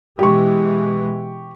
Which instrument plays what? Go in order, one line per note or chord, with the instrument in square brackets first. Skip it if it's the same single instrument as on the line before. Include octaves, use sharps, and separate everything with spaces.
[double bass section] B2 E3 G#3 [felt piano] G4 C#6